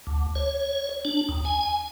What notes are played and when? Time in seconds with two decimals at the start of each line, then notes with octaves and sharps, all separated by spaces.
0.07 D2
0.35 C#5
1.05 D4
1.29 D#2
1.45 G#5